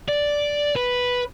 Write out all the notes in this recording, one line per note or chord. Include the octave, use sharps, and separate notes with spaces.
D5
B4